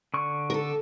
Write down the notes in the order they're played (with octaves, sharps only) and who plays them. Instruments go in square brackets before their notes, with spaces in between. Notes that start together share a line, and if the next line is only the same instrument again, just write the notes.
[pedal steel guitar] D3 C#6
[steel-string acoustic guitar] A4 A#4